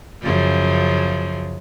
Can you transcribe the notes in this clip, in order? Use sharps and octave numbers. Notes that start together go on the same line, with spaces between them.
F#2 C#3 F3